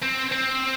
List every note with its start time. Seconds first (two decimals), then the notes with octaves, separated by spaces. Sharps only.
0.02 C4
0.32 C4